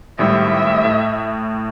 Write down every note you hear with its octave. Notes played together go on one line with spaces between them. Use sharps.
G#1 A2 G3 E5
A2